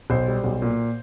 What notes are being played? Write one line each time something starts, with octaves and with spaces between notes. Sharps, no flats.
B1 C5
G3
B1
A#2